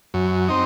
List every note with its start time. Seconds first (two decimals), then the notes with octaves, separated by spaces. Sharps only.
0.14 F#2
0.48 C4 D#4